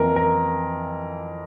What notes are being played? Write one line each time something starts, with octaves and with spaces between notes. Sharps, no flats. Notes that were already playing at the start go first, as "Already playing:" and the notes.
Already playing: F2 E3 A#3 A#4
A#4